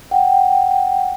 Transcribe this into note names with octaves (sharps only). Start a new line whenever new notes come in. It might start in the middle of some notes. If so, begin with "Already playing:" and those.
F#5 G5